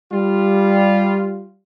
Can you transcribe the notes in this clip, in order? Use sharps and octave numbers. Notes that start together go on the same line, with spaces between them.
G3 F4